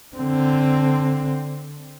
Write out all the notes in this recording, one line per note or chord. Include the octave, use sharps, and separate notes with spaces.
D3 C4